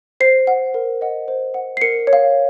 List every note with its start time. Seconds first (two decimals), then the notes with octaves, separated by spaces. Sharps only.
0.20 C5 C7
0.47 F#5
0.74 A#4
1.01 D#5 F#5
1.28 C5
1.54 F#5
1.77 C7
1.81 A#4 C#7
2.07 C#5
2.13 F5